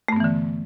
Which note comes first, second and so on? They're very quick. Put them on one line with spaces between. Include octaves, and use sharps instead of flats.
A3 G2 B3 E3 D3